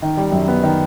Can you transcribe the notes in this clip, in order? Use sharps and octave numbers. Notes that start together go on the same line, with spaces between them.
D#3
G3
F#2
B3
D#3